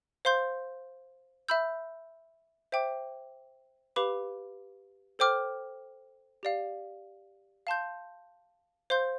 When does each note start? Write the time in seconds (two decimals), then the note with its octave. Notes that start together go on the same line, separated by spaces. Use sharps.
0.25 C5 F5 C6 G6
1.48 E5 B5 E6 G6
2.72 C5 E5 G5 D6
3.96 G4 B4 F5 B5 D6
5.19 A4 C5 G5 D6 F6
6.43 G4 D5 F5
7.67 F5 A5 C6 G6
8.90 C5 F5 C6 G6